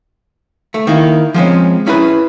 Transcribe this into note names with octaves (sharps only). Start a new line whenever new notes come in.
A3
D#3 A#3 E4
F3 G#3 C4 C#4
C#4 E4 G#4 B4